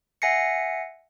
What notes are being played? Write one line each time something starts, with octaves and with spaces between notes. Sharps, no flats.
E5 F#5 G#5 A#6 C7 C#7